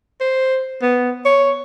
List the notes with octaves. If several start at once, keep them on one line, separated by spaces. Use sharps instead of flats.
C5
B3
C#5